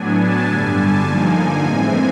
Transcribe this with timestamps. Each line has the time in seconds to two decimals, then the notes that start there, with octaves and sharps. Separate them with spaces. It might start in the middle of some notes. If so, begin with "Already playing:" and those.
Already playing: A2 F#3 B3 D4 G#5
0.17 A5
0.46 G2 D3 G3 G#5
0.76 A5
1.05 G2 D3 F3 A#3 D#4 G#5
1.64 A2 E3 G#3 C4